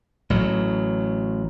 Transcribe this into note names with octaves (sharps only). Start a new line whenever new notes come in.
A1 F#3